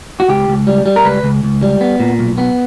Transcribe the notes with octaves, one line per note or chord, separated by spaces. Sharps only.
F#4
C#2 G4
C#2
G3
G3
A#4
C#2 B4
C#2
C#2
G3
B3
A#2
B1
B3